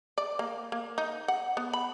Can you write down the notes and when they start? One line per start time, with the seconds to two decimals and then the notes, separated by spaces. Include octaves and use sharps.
0.18 D5
0.39 A#3
0.72 A#3
0.98 D#4
1.28 F#5
1.57 B3
1.73 B5